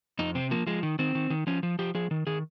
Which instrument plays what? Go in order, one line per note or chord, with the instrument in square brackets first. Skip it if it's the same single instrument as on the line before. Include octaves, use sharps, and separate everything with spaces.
[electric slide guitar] F2 D#4
C3 C4
F3 A#3
F3 G#3
D#3
D#3 C4
D#3
D#3
F3 C#4
F3
F3 G4
F3 G#4
D#3
D#3 G#4